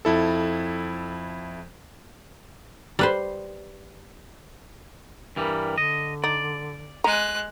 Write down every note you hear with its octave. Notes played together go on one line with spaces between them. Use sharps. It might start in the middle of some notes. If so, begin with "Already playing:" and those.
F2 E4 A4
G3 B4 C5
G2 E3 G3 A#4
D3 D#5
D#4 D5
G#3 A#5 F#6